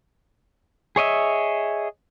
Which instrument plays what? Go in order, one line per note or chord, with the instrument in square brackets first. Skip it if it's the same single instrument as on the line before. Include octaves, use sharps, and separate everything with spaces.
[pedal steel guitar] G#4 C#5 D#5 E5